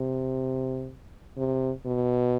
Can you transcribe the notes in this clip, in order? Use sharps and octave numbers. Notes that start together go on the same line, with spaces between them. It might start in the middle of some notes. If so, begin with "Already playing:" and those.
Already playing: C3
C3
B2